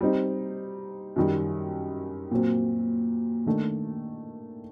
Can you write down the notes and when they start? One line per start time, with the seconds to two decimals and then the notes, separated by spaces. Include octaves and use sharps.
0.01 G3 C4 D#4
1.16 F#2 D#3 G3
2.31 A#2 F#3 C4
3.47 D#3 A3 D4